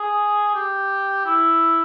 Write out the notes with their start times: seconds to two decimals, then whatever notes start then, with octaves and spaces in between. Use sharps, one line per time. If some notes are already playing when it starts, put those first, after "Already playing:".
Already playing: G#4
0.55 G4
1.26 E4